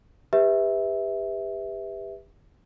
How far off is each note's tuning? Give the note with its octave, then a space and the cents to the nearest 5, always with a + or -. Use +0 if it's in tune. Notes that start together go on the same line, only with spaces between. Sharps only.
G4 +30 B4 +0 E5 -15